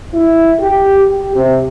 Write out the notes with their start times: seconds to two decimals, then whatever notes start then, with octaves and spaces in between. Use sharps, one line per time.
0.13 E4
0.59 G4
1.06 G4
1.35 C3